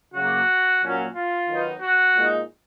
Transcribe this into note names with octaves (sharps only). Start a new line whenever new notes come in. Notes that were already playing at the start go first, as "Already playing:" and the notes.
C#3 F#3 A#3 F#4
A#2 F#3 C#4
F4
D#3 F#3 B3 D#4
F#4
A#2 G#3 D#4